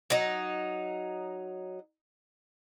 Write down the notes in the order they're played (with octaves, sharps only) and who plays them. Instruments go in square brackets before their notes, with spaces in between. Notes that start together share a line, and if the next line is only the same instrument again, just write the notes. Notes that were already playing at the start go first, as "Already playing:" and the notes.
[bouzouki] F#3 D#4